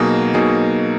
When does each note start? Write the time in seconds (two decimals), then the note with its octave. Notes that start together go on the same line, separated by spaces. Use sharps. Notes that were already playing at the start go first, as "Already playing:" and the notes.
Already playing: B2 F#3 A#3 D#4 G#4
0.34 B2 F#3 A#3 D#4 G#4